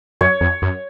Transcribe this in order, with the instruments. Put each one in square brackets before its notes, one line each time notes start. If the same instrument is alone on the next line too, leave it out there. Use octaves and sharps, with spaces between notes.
[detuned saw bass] F#2 [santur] C#5
[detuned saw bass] F2
F#2